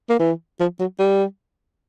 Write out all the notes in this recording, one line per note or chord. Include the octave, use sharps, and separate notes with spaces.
A#3
E3
F3
F#3
G3